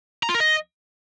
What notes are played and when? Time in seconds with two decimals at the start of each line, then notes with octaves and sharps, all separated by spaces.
0.23 A#5
0.29 F4
0.34 A#4
0.40 D#5